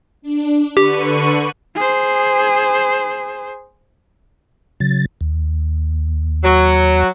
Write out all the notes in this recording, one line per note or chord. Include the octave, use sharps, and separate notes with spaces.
D4
D3 G4 B4 B5 C#6 D#7
G#4 C5
C#3 F#3 A6
D#2
F#3